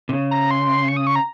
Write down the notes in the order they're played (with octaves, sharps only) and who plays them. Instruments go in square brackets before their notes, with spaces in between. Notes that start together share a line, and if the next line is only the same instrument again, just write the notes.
[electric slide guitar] C3
C#3
[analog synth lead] A#5
C6
C#6
D#6
C#6
A#5